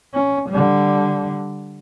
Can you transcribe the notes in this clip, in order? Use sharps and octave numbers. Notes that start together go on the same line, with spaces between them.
C#4
D3 G3